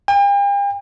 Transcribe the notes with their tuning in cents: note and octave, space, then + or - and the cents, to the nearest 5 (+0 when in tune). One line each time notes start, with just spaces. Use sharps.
G5 +45